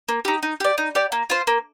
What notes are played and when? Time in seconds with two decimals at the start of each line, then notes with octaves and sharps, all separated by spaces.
0.09 A#3
0.25 D#4 G4
0.43 D#4
0.60 G4 D5
0.78 D#4
0.95 G4 D5
1.12 A#3
1.30 F4 C5
1.47 A#3